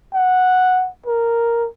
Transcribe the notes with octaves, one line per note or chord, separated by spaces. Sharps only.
F#5
A#4